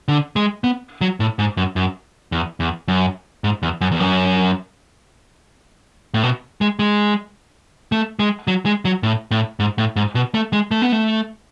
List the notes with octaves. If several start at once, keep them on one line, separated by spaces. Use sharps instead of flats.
D3
G#3
B3
F#3
A2
G#2
F#2
F#2
E2
E2
F#2
G#2
E2
F#2
E2
F#2
A2
B2
G#3
G#3
A3
G#3
F#3
G#3
F#3
A2
A2
G#2
A2
G#2
B2
A3
G#3
A3
B3
A3